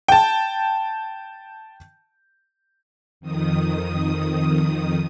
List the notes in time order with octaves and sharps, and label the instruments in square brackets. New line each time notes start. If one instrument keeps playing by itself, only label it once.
[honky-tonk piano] G5 A5
[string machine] F2 D#3 D#6